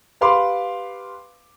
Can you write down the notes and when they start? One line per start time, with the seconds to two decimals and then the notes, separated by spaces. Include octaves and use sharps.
0.21 G4 B4 F5 B5 C6 D6